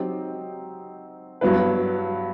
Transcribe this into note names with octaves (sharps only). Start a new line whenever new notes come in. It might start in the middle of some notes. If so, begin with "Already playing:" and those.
Already playing: F#3 C4 D#4 G4
G2 F#3 B3 E4 B4